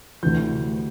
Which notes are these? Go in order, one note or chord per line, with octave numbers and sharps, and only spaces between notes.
D2 C3 E3 G6